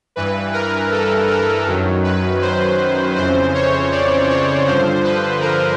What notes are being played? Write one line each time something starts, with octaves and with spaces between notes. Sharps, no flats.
G2 E3 B4
A#4
A4
A#4
F#2 D#3 F#3
B4
C5
F2 C#3 E3 C5
C#5
D5
C#5
G2 D3 F3 C5
B4
A#4